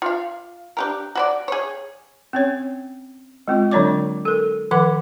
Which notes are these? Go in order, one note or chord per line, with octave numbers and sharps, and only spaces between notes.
F4 F5
D4 G4 A#4
F#4 C5 D5
G#4 C#5
C4 C#4 C#5
G#3 C4 F4
D3 F#3 D4 C#5 D5 D6
A4 A#4
D#3 F3 B4 F#5 D6